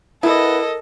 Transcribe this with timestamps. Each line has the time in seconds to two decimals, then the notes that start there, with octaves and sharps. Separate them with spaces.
0.23 B3 E4 A4 A#4 D#5